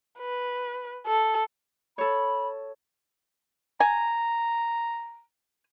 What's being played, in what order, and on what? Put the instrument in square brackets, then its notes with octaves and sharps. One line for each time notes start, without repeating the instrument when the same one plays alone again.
[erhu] B4
A4
[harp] A4 C#5 [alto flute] B5
[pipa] G#5 [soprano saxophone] A#5